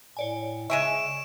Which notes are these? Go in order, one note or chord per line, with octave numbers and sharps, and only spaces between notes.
A2 C#5 D5 G#5
C#3 G#3 G#4 E5 C#6 D7 E7